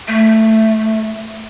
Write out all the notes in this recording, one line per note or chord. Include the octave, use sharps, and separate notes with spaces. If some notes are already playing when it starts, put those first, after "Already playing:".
A3